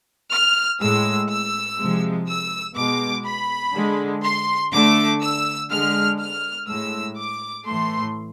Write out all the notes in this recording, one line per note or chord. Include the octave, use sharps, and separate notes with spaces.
F6
A2 G#3 E6
E6
C3 F3 G#3
E6
B2 G#3 D6
B5
D3 G#3
C6
D3 A3 D6
E6
D3 G#3 F6
F6
A2 G#3 E6
D6
A2 E3 A3 C6